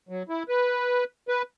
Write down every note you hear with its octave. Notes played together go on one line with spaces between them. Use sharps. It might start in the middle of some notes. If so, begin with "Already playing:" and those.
F#3
E4
B4
B4